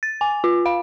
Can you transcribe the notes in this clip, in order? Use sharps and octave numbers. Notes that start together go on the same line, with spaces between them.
A6
G#5
F4
F5